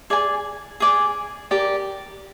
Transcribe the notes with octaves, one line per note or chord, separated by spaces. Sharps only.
G#4 D5 G#5
G#4 D5 G#5
G4 A#4 D5